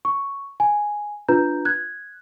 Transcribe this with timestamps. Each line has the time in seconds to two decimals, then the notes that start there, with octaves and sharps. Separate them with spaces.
0.05 C#6
0.60 G#5
1.28 D4 F4 B4 A#5 G6
1.65 F#6 G#6